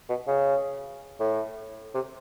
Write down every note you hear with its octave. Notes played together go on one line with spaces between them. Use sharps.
B2
C#3
A2
C3